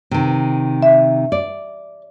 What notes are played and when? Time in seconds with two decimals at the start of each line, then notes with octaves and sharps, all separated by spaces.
0.11 C3 D#3
0.83 E5
1.32 D5